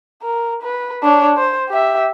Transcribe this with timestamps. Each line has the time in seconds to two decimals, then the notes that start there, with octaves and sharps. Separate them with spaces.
0.22 A#4
0.62 B4
1.03 D4 C#5
1.37 C5
1.69 G4 E5